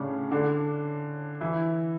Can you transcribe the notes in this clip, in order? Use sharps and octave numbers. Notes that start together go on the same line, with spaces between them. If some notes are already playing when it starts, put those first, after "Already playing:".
Already playing: A2 C#3 C#4 D4
D3 D4
E3 E4